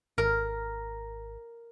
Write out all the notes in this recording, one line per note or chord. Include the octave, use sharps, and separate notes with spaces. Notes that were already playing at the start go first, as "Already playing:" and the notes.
G#1 A#4